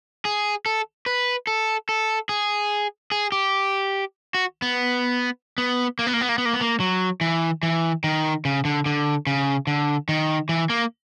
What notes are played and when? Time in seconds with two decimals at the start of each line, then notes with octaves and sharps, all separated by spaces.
0.25 G#4
0.66 A4
1.06 B4
1.47 A4
1.89 A4
2.29 G#4
3.11 G#4
3.32 G4
4.34 F#4
4.62 B3
5.58 B3
5.99 A#3
6.07 B3
6.13 A#3
6.21 B3
6.29 A#3
6.38 B3
6.45 A#3
6.53 B3
6.61 A#3
6.80 F#3
7.21 E3
7.63 E3
8.04 D#3
8.45 C#3
8.65 D3
8.86 D3
9.27 C#3
9.67 D3
10.09 D#3
10.49 E3
10.70 A#3